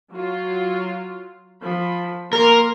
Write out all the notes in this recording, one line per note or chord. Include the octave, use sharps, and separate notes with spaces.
F#3 F4
F3 B5
A#3 A#4 C6